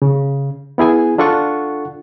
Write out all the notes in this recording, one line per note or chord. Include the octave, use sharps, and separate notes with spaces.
C#3
B3 E4 G#4 G#5
D4 F4 A4 F#5 C#6